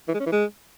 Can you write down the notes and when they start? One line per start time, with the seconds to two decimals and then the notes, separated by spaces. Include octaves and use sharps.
0.08 E3
0.14 G#3
0.20 C#4
0.26 E3
0.32 G#3